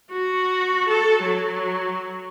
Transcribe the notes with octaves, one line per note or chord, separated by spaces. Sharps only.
F#4
A4
F#3